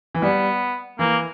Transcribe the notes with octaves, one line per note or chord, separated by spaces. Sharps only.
E3
G3 B3
E3 A#3